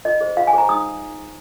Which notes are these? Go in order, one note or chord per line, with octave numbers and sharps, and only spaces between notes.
F4 D#5
G#4 C5
F4 F5
G#5
G#4 C5 A#5
D#4 D#6